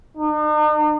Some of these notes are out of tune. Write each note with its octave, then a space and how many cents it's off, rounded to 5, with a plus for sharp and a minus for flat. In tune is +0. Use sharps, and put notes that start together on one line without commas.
D#4 -45